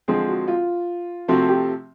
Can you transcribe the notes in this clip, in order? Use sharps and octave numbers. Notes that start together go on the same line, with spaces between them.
D3 F3 G#3 C4 G#4
F#4
F4
C3 F3 A3 C4 F#4
G4